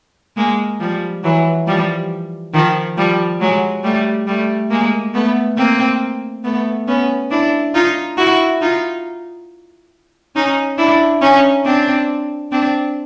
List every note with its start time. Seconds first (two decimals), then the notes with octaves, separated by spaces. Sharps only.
0.37 G#3 A#3
0.80 F3 G3
1.24 E3 F#3
1.67 F3 G3
2.54 D#3 F3
2.97 F3 G3
3.41 F#3 G#3
3.84 G3 A3
4.27 G3 A3
4.70 G#3 A#3
5.14 A3 B3
5.57 A#3 C4
6.44 A3 B3
6.88 B3 C#4
7.31 D4 E4
7.74 D#4 F4
8.18 E4 F#4
8.62 D#4 F4
10.35 C#4 D#4
10.78 D4 E4
11.22 C#4 D#4
11.65 C4 D4
12.52 C4 D4